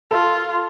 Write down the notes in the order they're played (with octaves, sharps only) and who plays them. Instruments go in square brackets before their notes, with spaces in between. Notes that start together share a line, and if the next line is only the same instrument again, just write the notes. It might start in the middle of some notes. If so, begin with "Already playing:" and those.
[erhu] F4 [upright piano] A4